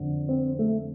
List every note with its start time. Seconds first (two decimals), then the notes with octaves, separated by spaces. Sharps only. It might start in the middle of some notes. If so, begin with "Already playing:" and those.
Already playing: F2 D3
0.29 C4
0.59 A3